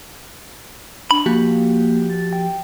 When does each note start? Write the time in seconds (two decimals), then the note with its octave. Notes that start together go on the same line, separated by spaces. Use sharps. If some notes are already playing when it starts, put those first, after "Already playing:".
1.11 D4 B5
1.26 F3 A#3 F#4 G4
2.10 A6
2.33 G5